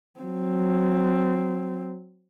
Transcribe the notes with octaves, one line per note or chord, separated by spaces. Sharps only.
F#3 C4